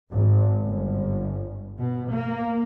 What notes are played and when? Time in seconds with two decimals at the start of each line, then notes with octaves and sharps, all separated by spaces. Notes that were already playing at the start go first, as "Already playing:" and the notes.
0.11 G#1
0.63 G1
1.79 B2
2.13 A#3